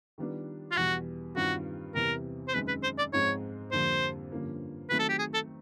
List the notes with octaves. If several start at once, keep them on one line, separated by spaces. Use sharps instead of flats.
D#3 G3 B3 D4 F4
F4
E2 B2 G3 F#4
G2 D#3 G3 C4 F4 F#4
E2 C3 E3 G3 A#4
C5
F#2 D#3 G#3 C4 B4
B4
C5
D5
G#2 F3 G#3 C4 F4 C#5
F2 D3 G3 A#3 C5
G2 D3 F3 A#3 C#4
D#3 F#3 A3 C4 B4
A4
G4
G#4
A4